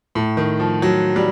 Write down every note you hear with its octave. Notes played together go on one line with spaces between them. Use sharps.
A2
D#3
F3
F#3
G3